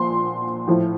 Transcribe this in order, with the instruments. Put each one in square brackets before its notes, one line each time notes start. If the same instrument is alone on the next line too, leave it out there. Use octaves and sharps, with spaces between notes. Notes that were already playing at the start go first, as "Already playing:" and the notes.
Already playing: [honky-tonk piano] A#2 F3 C6
A2 F3